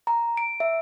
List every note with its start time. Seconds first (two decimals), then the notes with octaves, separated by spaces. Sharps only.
0.07 A#5
0.37 D7
0.60 E5